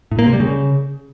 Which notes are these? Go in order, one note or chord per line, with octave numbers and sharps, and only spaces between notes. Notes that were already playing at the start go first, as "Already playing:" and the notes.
A2
A#3
C3
G3
C#3